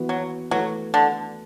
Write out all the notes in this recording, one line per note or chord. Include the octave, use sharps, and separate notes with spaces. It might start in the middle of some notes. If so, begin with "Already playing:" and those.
Already playing: E3 B3 F#4 B4
F#3
E3 F#3 A3 E4 B4
D3